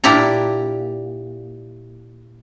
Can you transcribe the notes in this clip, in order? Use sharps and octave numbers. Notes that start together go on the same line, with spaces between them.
A#2 D4 E4 G4 D5 A#5